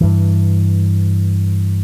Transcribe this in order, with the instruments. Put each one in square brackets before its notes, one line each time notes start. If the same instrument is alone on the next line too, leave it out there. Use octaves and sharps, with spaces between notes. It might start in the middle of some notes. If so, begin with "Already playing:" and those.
[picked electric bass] G2 E3